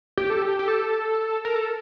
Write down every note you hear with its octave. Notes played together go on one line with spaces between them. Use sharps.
G4
A4
G4
G4
A4
A#4
A4